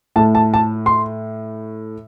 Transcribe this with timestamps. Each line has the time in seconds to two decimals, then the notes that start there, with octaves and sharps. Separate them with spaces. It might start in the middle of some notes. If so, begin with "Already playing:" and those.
0.16 A2 A5
0.19 A3
0.35 A5
0.54 A5
0.86 C6